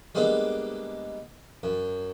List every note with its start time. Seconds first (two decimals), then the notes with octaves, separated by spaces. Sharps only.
0.15 G3 G#3 A#3 B3 D4
1.63 F#2